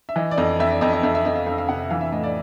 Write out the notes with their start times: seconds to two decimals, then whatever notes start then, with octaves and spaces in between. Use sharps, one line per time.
0.09 E5
0.16 E3 D#5
0.31 D5
0.38 F2 D#5
0.60 F2 E5
0.70 D5
0.81 F2 D#5
0.93 D#5
1.03 F2 E5
1.15 E5
1.25 F2 D#5
1.35 F5
1.46 F2 F5
1.58 F5
1.69 C3 F#5
1.90 E3 F5
2.01 E5
2.12 A2 D#5
2.23 D5